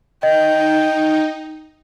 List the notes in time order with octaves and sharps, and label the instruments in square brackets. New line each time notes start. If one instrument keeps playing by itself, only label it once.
[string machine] D#4 [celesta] D#5 [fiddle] G5